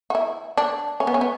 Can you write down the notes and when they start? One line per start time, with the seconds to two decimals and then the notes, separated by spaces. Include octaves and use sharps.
0.10 F#4
0.15 E4
0.57 D4
1.00 C#4
1.07 B3
1.14 C#4
1.21 B3